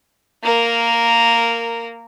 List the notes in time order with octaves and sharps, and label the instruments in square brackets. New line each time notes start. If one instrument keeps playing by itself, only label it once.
[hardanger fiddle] A#3 A#4